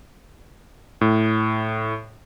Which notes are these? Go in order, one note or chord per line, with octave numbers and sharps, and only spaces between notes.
A2